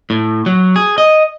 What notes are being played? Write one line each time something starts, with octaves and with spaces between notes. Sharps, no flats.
A2
F#3
G#4
D#5